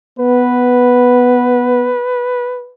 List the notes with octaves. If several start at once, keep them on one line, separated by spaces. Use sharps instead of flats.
B3 B4